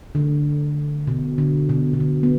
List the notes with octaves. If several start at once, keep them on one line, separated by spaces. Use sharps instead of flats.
D3
B2
D3
B2
B2
D3
B3